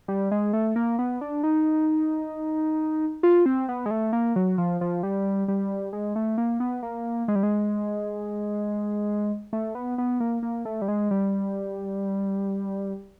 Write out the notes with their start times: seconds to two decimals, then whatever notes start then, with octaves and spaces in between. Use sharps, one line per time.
0.08 G3
0.31 G#3
0.53 A3
0.76 A#3
0.99 B3
1.21 D4
1.43 D#4
3.23 F4
3.46 C4
3.69 B3
3.86 G#3
3.91 A3
4.13 A#3
4.36 F#3
4.58 F3
4.81 F3
5.03 G3
5.48 G3
5.93 G#3
6.16 A3
6.38 A#3
6.60 B3
6.83 A#3
7.28 G#3
7.35 G3
7.43 G#3
9.53 A3
9.75 B3
9.98 B3
10.20 A#3
10.43 A#3
10.65 A3
10.82 G3
10.88 G#3
11.11 G3